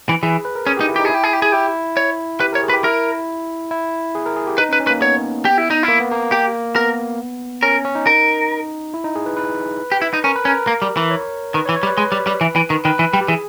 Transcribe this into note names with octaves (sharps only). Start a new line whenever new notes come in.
E3
E3 G#4
B4
A#4
C#4 G#4
D#4 G4
E4
D#4 G4
G#4
E4 G4
G#4
G4
G#4
E4 G4
C#5
G4 B4
A#4 C#5
G#4
B4
G4
E4 A#4
E4
G#4
A#4
G#4
G4
D#4 B4
C#4
B4
C#4
B4
A#3
B3 C#5
G4
E4
D#4
E4
A#3
B3
A#3
G4
B3 A#4
C#4 A#4
C#4
D#4
A#4
E4
D#4
G#4
B4
B4
G4
E4
D#4
C#4 A#4
B4
C#4 A#4
A#3
G3
E3
C#5
D#3 B4
C#5
E3
C#5
G3
B4
G#3 B4
G3
G3
E3
E3
D#3
D#3 B4
E3
G3
G4
E3 G#4